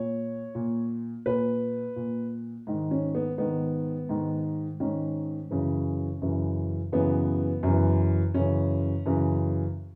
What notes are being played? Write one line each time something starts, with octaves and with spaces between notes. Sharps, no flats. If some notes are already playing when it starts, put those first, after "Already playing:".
Already playing: A#2 C#5
A#2
A#2 B4
A#2
G#2 D#3
C#4
B3
G#2 D#3 B3
G#2 D#3
G#2 D#3 C#4
F#2 C#3 E3
F#2 C#3 E3
F#2 C#3 E3 B3
F#2 C#3 E3
F#2 C#3 E3 C#4
F#2 C#3 E3